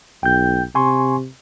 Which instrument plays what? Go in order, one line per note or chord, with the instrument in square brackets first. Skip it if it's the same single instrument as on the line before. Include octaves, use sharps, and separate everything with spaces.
[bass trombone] B1 [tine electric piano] G5 G6
[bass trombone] C3 [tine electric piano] G#5 C6 C#6